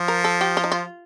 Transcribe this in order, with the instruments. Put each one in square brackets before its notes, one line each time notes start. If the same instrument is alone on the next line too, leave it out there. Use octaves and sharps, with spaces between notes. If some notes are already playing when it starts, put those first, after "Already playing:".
Already playing: [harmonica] F3
[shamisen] A#4
A4
G4
F4
D#4
F4